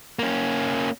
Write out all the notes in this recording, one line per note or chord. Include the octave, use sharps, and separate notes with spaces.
A#3 C#4